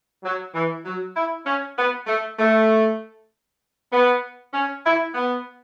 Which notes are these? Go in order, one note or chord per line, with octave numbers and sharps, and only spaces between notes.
F#3
E3
F#3
E4
C#4
B3
A3
A3
B3
C#4
E4
B3